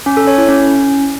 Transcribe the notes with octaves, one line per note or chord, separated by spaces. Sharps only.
C#4
A4
C#5
E4
C#4